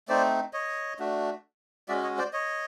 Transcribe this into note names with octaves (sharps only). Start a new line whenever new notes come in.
A3 C4 D#4 C5 D5
C#5 D#5
A3 D4 F#4
G#3 C#4 F#4 D5 E5
C#5 D#5
C5 D5
C#5 D#5